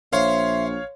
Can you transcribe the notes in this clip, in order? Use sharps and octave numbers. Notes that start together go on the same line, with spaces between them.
A#1 C5 C#5 E5 F5